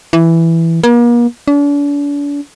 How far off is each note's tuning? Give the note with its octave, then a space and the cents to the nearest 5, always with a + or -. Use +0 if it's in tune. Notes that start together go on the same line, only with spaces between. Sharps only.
E3 +5
A#3 +40
D4 -40